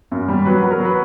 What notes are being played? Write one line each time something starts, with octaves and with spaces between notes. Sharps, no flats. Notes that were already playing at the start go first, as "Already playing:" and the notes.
F#2
G3
F#3 B4
B4
F#3
A#4
F#3 B4